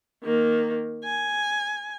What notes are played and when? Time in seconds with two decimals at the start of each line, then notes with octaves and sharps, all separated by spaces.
0.24 D#3 A#3
1.05 G#5